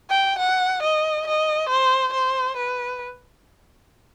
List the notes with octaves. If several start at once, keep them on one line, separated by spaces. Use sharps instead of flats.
G5
F#5
D#5
D#5
C5
C5
B4